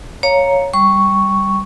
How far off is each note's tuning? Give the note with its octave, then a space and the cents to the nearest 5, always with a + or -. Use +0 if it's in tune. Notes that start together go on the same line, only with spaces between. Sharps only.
C#5 +0 F5 +0 A#5 +0
G3 +0 C#6 +0